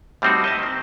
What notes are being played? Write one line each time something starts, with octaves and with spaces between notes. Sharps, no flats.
A2 G3 A#3 C4 D#4 F#4
D#5 E5 A5
D#3 C4